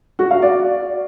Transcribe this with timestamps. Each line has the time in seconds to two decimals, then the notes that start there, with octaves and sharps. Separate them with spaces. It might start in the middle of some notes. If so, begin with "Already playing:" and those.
0.19 F#4
0.31 F5
0.42 D5